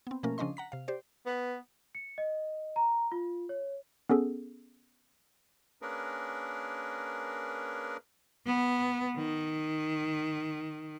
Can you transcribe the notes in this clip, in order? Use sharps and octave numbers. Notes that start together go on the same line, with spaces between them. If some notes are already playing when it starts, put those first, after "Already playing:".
B3 C4
B2 F3 A3 A#3 C#4 A#4
C#3 F3 C#4 D4 D#5 C6
F#5 A#5 B6
C3 F5
G4 C5 D5
B3
C#7
D#5
A#5
F4
C#5
B3 C#4 G#4 A4
A#3 C#4 D4 G#4 A#4 B4
B3
D#3